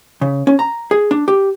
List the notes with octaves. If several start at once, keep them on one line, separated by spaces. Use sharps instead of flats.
C#3
C#4
A#5
G#4
D4
G4